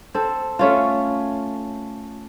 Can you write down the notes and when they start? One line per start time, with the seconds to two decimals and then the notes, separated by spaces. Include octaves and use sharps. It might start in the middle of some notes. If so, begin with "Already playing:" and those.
0.15 C4 A4
0.59 A3 C#4 F4